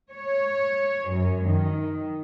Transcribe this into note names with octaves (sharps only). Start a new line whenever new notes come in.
C#5
F#2
D#3